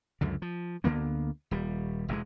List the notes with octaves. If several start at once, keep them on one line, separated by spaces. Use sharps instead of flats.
C#2 F#2 D3
F3
D2 D3 A#3 B3
D#1 G3
E1 E2 G#2 G#3